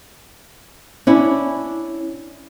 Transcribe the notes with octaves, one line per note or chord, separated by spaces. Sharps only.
C#4 D4 E4